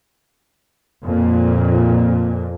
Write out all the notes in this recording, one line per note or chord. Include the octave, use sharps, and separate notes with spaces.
F2 A#2